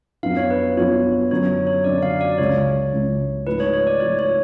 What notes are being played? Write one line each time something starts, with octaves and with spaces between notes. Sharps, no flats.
F#2 F3 B3 D4 F4 F5
C#5
B4
F#2 F3 B3 D4 F4 C#5
F#2 D3 F#3 C#4 C#5
C#5
F#2 D3 F#3 C#4 D5
F5
D5
C#2 C#3 G#3 C#5
C#2 C#3 G#3
G#2 F3 A3 B4
C#5
C#5
D5
G#2 F3 A3 C#5
C#5